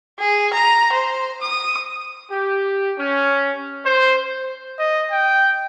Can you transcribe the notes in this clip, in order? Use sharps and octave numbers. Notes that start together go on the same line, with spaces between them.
G#4
A#5
C5
D#6
G4
C#4
C5
D#5
G5